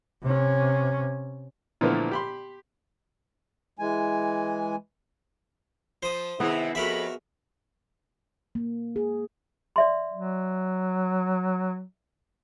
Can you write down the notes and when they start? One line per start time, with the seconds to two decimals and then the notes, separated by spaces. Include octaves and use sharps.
0.23 C3 C#4
1.81 A#2 D3 E3 F3 A3 B3
2.11 G4 B5 C6
3.79 E3 G#3 G#5
6.03 F3 C5 D#6
6.40 C3 D#3 B3 E4 G#4
6.75 F2 F#4 A4 A#4 E5 B5
8.55 A#3
8.96 G#4
9.76 D5 E5 C6
10.13 F#3